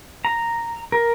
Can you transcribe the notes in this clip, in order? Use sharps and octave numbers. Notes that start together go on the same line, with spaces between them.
A#5
A#4